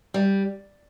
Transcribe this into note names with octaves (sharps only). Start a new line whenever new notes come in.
G3